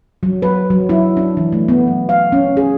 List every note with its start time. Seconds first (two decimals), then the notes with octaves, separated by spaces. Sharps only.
0.23 F#3
0.42 B4
0.70 F#3
0.89 E4
1.17 D4
1.37 E3
1.52 A3
1.68 B3
1.87 F#3
2.09 F5
2.32 C#4
2.57 G#4